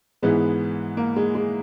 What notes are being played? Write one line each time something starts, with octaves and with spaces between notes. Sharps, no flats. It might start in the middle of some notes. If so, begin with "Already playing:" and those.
G#2 E3 G#3 B3
A#3
G#3
G#3